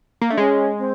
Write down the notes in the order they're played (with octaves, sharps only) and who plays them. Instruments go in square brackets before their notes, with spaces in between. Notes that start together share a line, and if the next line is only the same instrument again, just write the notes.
[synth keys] A#3
[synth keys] A3 [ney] D4
[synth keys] G#3 [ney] C#4
[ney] C4